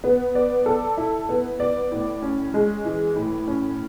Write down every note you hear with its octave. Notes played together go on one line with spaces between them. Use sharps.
B3
D5
A4
E4
B3
D5
A2
C#4
G#3
E3
A2
C#4